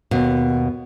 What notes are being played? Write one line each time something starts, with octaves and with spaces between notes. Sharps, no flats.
D#2 B2